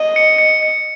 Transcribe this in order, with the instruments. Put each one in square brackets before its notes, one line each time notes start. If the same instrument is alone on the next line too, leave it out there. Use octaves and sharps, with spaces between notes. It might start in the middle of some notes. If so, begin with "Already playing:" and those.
Already playing: [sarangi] D#5
[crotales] C#7
C#7
C#7